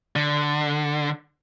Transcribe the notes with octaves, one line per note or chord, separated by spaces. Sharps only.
D3